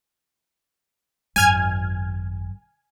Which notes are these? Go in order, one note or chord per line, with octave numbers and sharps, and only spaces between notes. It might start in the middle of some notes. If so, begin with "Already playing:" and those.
G#1 F#2 G#5 F6 G#6